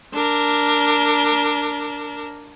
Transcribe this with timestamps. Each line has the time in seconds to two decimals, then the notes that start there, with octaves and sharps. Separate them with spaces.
0.14 D4 A#4